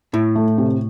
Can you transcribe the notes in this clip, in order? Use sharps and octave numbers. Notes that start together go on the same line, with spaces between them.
A2 E4
A3
C3